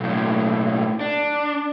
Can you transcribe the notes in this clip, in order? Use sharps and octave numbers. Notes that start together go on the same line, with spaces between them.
B1 A2
D4